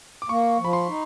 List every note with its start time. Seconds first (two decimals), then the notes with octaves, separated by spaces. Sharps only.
0.22 D6
0.29 A#3 C#6
0.59 F3
0.65 B5
0.73 C6
0.88 D#4